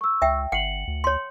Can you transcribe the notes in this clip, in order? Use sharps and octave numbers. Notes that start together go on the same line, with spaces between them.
C#6 E6
C#2 E5 G5
G1 F#5 C#7 F#7
D2
C#5 C6